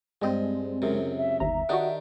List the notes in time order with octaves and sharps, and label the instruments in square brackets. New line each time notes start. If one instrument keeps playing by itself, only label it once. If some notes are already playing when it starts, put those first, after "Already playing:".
[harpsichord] G2 D#5 [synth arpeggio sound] G#3 C4
[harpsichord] C#2 F#2 C3 [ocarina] A#4
[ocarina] E5
[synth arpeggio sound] G1 D#2 A#5 [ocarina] E5
[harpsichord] D#3 D4 G4 [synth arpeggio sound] F#4 D#5 F#5